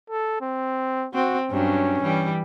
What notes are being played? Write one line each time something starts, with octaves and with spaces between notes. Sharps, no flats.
A4
C4
C4 F#4
G2 F#3 C#4
E3 G3